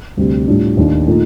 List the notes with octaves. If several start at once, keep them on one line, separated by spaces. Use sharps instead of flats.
D2 C3 G3
A2 G3 D4 F4
D#2 D#3 A3 D4
A#2 A3 D#4